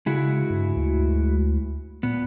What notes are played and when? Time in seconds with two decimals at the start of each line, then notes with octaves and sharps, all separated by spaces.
0.06 C#3 G#3 E4 F#4
0.50 G2
0.76 D2
2.03 A#2 B3